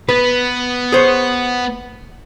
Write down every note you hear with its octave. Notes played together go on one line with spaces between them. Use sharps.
B3 B4
G#4 C5 C#5